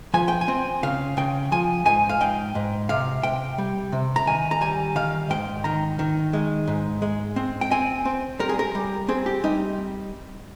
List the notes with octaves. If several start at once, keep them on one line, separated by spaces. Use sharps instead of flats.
F3 G#5
G5
G#5
C4
C#3 F5
C#3 G5
F3 G#5
G#2 G#5
F5
G#2 G5
G#2
C3 F5
C3 G5
G3
C3
A#5
D#3 G#5
A#5
G3 G#5
D#3 F5
G#2 G5
D#3 A#5
D#3
G#3
G#2
G#3
C4
G5
C4 G#5
C4
G3 A#4
G#4
A#4
G3
C4 G#4
G4
G3 D#4